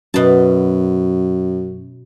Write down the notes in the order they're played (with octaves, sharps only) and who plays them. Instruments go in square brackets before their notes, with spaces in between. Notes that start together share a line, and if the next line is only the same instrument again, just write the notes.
[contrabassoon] F#2 [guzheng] B2 A5